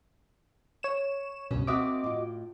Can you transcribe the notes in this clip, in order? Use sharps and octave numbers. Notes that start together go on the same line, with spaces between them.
C#5 E7
C#2 G2 B2 C#4 C#5
A#3 C4 F#4 D#5 E5 D6
A2 F4